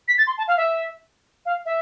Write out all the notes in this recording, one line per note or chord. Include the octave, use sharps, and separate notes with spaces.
B6
A6
C6
A5
F5
E5
F5
E5